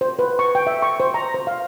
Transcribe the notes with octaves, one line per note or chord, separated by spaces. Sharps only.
C5
B4
C#6
G5
E5
C#6
C5
A#5
C5
F5